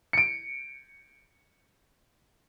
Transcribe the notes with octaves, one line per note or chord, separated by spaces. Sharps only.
C#7 D7